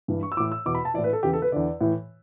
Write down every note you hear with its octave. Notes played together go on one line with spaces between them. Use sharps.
G2 E3
C#6
E6
A2 E3 D6
E6
E2 B2 D6
B5
A5
A2 E3 D5
B4
A4
E2 C#3 E3 G4
A4
B4
E2 D3 D5
A2 E3